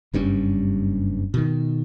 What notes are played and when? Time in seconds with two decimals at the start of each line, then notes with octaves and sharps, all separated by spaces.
0.14 F#1 G2 G3 C#4
1.34 B2 D#3